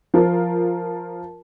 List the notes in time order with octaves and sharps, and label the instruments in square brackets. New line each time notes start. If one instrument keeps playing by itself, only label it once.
[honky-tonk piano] F3 F4 A#4